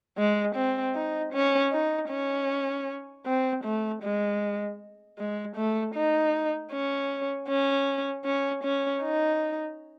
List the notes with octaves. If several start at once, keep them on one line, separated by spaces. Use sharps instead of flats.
G#3
C4
D#4
C#4
D#4
C#4
C4
A3
G#3
G#3
A3
D#4
C#4
C#4
C#4
C#4
D#4